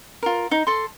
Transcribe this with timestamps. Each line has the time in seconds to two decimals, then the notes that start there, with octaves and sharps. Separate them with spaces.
0.23 F4 A#4
0.51 D#4
0.67 A4 C6